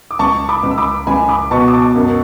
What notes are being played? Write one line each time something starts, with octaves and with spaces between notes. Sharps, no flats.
D6
C#2 A5 C#6
B5 D6
C#2
E6
B5 D6
C#2 G#5 B5
B5 D6
B2 A5 C#6
D6
A5 C#6
F#2